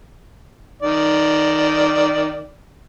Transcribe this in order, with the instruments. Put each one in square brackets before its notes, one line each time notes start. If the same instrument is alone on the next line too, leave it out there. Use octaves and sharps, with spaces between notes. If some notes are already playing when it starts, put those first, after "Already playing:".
[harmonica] D#3 D5